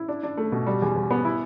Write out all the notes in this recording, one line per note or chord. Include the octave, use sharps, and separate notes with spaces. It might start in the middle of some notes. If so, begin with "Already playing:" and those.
Already playing: E4
D4
D4
A3
B2
G3
E2
E2
B3
E4